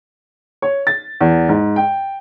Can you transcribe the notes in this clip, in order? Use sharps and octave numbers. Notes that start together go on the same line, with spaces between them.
C#5
A6
E2
G#2
G5